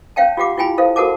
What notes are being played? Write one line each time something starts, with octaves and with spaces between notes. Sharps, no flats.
C#4 C#5 F5 G5 A5
F4 G4 F#5 D6
E4 F4 G5 G#5 B5
E4 A4 C5 F5
F#4 A4 A#4 F#5 A5 D6